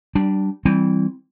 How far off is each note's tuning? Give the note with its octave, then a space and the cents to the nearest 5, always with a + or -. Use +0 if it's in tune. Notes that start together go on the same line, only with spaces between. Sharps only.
G3 -25 D4 +0
E3 -10 G3 +0 C4 +0